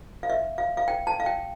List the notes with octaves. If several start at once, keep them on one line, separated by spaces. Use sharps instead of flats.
F5
E5
F5
F5
G5
A5
F5
G5